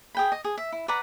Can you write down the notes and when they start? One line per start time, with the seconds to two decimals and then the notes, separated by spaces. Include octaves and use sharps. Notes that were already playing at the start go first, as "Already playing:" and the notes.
0.15 G#4 G5 B5
0.32 D#5
0.45 G#4
0.58 E5
0.72 E4
0.88 B4 D5 F#5 A#5